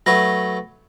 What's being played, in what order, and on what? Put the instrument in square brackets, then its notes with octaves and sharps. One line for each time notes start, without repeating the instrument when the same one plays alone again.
[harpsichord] F#3 A3 B4 [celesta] A#6